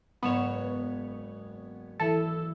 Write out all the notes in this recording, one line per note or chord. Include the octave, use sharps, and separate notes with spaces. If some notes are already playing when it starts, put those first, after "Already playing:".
F#1 G#2 B3 C#5 E7
E3 E4 A4